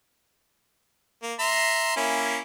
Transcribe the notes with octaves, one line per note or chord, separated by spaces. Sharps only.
A#3
E5 A#5 C6
A#3 C#4 E4